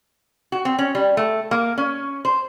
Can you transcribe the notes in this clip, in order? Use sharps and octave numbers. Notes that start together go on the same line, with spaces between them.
F#4
C4
C#4
G3
A3
A#3
C#4
C5